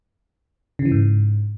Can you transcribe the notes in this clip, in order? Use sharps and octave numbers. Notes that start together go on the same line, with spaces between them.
C#3
E3
G#2